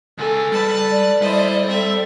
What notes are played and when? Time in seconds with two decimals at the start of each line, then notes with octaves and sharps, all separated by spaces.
0.18 C#2 A4 G#5
0.52 G3 B4 A5
0.90 D5
1.21 G3 E4 C5 D#5
1.67 C4 A4 E5